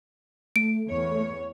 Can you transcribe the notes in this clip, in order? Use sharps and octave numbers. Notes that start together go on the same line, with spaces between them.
A3 D7
E2 C#5